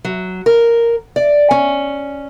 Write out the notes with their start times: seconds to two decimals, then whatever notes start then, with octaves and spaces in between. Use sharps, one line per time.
0.05 F#3
0.46 A#4
1.16 D5
1.51 C#4